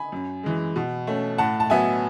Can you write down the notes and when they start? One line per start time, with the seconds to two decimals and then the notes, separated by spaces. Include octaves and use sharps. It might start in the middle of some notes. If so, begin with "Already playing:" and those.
Already playing: G#5 B5
0.12 F#2
0.43 E3 G#3
0.76 B2
1.07 A3 C#4
1.38 A2 F#5 A5
1.60 A5
1.70 F#3 B3 E5 G#5